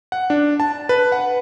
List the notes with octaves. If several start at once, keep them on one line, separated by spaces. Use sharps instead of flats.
F#5
D4
A5
B4
F#5